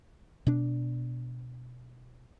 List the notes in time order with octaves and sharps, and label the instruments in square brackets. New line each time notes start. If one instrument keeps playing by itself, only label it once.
[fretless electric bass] B2 D4